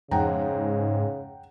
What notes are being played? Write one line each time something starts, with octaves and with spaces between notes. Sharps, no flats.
F2 G#2 C#3 F#5 G5 A#5